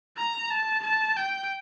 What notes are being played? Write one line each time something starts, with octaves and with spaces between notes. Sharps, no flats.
A#5
A5
A5
G5